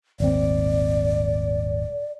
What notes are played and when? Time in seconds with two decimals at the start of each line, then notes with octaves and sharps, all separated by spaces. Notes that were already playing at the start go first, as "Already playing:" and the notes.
0.20 D#1 G#1 C4 D5